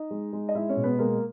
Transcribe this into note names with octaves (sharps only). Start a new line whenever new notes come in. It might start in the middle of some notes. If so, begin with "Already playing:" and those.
Already playing: D#4 D#5
G#3
G#3
D#5
G#3 E4 E5
C#4 C#5
B2
B3 B4
G#3 A#3 A#4